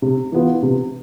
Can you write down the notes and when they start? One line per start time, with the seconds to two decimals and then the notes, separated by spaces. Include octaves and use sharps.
0.02 C3
0.32 E3 B3 F4
0.62 C3